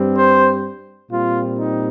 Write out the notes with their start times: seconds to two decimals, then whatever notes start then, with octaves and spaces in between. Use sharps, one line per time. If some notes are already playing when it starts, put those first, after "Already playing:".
Already playing: G2 G3 C4
0.16 C5
1.11 A#2 G3 C4 F4
1.58 D#4